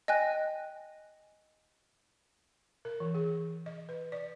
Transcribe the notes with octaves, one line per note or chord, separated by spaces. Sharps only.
D#5 G5 G#5 F#6 A#6
A#4
E3
G#4
D#5
B4
D5